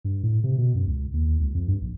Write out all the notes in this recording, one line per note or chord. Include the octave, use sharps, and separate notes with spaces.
G2
A2
C3
B2
F#2
C#2
D#2
C#2
F2
G2
A#1